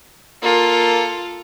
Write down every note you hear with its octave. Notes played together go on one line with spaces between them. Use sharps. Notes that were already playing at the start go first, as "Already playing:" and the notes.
A#3 F4 A4